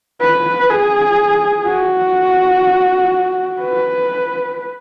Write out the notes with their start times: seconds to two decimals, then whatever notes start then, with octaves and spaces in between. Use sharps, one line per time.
0.21 B4
0.70 G#4
1.66 F#4
3.61 B4